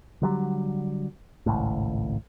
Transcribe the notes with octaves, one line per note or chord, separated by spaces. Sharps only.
D3 F#3 G3
G#1 C#2 A2